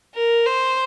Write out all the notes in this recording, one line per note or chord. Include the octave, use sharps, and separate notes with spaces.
A#4
C5